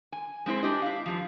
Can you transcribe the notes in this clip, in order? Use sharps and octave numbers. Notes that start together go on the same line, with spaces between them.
G#5
G#3 C4 E4 C5
D4 G4 D#5
E4 F5
G2 A#2 F3